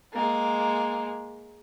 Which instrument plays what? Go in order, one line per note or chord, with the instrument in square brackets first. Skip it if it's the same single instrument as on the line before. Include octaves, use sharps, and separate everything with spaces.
[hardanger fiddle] G#3 A#3